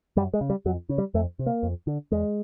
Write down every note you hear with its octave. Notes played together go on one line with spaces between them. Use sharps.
F#2 G3
G#3
C#3
G3
F2 F#3
C#3
G3
F2 A3
C3
A#3
F2
D3
E2 G#3